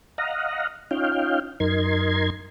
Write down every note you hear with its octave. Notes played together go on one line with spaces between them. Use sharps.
D#5 F5 F#5 A#5
C#4 D#4 F4 F5 G5
F#2 D#4 A#4 C6 G#6